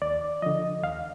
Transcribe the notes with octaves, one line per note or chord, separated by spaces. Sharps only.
D#2 D5
D3 F3 D#5
D#2 F5